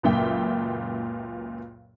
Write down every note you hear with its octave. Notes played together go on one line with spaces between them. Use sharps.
C#2 F#2 A#2 E5 G5